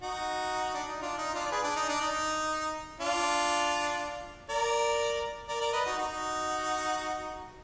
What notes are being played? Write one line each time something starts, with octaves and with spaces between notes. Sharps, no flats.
D#4 F#4
D4
D#4
D4 F4
D#4
D4 F4
D5
G#4 B4
D4
D#4
D4
D#4
D4 F4
A#4 D5
A#4 D5
A#4 D5
B4 D#5
D#4 F#4
D#4 F#4